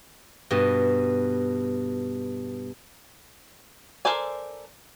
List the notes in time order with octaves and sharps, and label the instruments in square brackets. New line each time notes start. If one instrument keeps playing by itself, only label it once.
[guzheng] G2 B2
[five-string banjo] A4 A#4 C5 D5 G#5